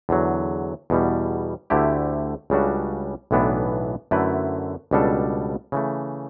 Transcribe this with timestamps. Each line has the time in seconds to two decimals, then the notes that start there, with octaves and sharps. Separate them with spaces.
0.09 E2 D3 F#3
0.90 E2 B2 G3
1.70 D2 D3 A3 E4 G4
2.50 C#2 C#3 G3 D4 F#4
3.31 B1 A2 E3 B3 D4
4.11 F#2 D3 A3 E4 B4
4.91 C#2 B2 G3 D4 A4
5.72 C#3 E3 A3